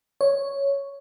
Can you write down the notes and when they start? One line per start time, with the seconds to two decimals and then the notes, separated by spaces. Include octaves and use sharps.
0.21 C#5